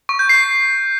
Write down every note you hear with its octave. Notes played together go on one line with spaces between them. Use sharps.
C#6
G6
C7